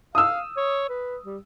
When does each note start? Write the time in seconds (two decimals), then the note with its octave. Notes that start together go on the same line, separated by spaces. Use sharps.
0.15 F5 D#6 E6
0.57 C#5
0.89 B4
1.25 G3